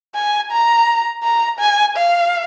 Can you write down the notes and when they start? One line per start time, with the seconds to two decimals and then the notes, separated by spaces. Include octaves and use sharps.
0.15 G#5
0.52 A#5
1.23 A#5
1.60 G#5
1.97 F5